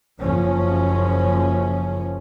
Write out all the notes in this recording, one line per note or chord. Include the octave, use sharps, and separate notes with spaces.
F#1 F#2 F3 C#4